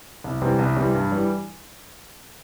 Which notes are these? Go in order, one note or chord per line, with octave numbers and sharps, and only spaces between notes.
C2
C3 E3 G3 C4
C2
C3 E3 G3 C4
G2
E3 G3